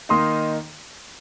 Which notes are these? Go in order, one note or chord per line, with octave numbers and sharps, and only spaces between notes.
D#3 A#3 D#4 C6 D#6